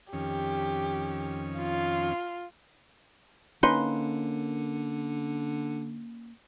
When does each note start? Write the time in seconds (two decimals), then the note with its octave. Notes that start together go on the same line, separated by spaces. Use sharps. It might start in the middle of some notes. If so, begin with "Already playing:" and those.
0.13 F2 D#3 C#4 G4
1.58 F4
3.63 D3 A#3 C#4 D#4 B4 C6